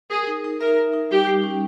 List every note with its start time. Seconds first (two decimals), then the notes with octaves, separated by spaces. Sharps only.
0.10 G#4 A#4
0.27 D#4
0.44 D#4
0.61 A#4 E5
0.77 A#4
0.93 D#4
1.11 G3 G4
1.27 G3
1.44 C#4